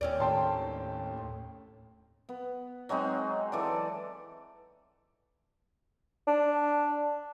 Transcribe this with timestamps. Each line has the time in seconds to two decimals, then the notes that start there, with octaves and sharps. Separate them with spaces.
0.01 D#2 C4 C#4 D5
0.20 A2 G5 A5 C6
2.29 B3
2.89 F#3 G#3 C4 D#4
3.52 E3 A4 D5
6.27 D4